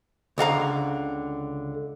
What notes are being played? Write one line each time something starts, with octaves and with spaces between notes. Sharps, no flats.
C#2 D3 F5 A#5